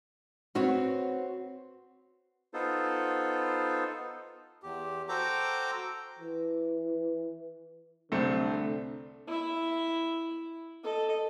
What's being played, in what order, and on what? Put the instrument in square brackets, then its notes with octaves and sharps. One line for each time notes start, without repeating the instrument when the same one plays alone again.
[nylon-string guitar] C4 F#4 B4 C#5
[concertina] B3 D#4 F4 A4 C5
[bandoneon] E2 G4
F#4 A4 C5 G5 A#5 D6
[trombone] E3
[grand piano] C2 A3 C4 [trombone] D3
[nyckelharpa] E4 E5
A4 D#5